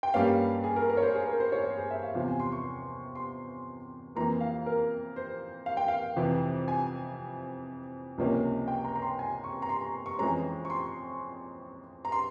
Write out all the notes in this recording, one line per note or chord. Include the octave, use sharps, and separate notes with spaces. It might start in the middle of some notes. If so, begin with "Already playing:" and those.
G5
G2 G3 A#3 C#4 F5
G#4
A#4
A#4
C#5
C5
G#4
A#4
C5
C#5
C5
G#4
E5
F5
E2 C3 F3 C4 F5
G#5
C6
C#6
C6
F2 E3 A#3 A#5
F5
A#4
C5
F5
G5
F5
F2 C3 E3
G#5
C#2 C3 F3 A#3 C#4
G5
A#5
A#5
C6
G#5
C#6
A#5
C6
A#5
C#6
F2 E3 G#3 C#4 A#5
C#6
C6
A#5
C6